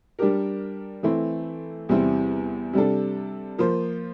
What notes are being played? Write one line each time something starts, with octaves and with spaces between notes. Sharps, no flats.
G3 D4 G4 A#4
E3 A3 C4 E4
E2 C3 G3 C4 E4
C3 G3 D4 A4
F3 A#3 F4 C5